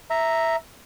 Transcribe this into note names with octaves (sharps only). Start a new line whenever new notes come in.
E5 A#5